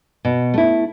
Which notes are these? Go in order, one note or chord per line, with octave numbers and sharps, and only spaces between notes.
B2
A3 E4